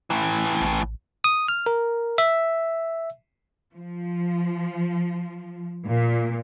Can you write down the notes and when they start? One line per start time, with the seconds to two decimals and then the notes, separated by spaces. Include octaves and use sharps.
0.10 A2 E3
0.61 A1
1.24 D#6
1.48 F6
1.66 A#4
2.18 E5
3.75 F3
5.87 A#2